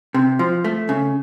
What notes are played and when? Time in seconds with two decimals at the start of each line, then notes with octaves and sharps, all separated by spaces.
0.14 C3
0.39 F3
0.64 A3
0.89 C#3